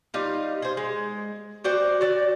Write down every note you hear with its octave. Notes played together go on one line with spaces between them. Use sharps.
G3 D#4 F4
G#4 C5
G#3
F#4 C5 D5 G5
F#4 D5